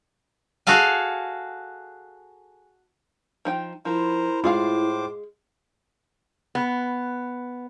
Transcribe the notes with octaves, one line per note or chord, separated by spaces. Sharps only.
F#4 G#4 A4 F5 G#5
F3 D#4 G5
F3 E4 A#4 C5
A2 G#3 F4 G#4 C5 F5 D6
B3